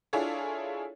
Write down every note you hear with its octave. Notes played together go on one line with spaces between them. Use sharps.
D4 E4 F4 G#4 A4 C#5